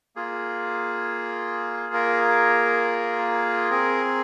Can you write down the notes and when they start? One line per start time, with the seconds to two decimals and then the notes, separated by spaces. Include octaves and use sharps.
0.16 A#3 F4 G#4
1.94 A#4
3.70 C4 G#4 A#4